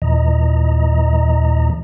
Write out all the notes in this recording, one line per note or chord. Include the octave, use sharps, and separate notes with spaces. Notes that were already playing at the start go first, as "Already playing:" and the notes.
D#2 A#2 E3 D#5 A#5